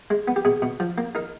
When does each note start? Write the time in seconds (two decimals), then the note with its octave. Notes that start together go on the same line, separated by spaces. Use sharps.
0.10 G#3
0.28 B3
0.36 G4
0.45 B2 G#4
0.62 B2
0.80 F3
0.98 A#3
1.15 D#4 A#4